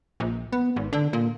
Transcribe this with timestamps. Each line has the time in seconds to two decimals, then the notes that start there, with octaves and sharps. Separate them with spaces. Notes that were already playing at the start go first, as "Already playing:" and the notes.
0.20 A#1
0.53 B3
0.76 G#1
0.93 D3
1.13 A#2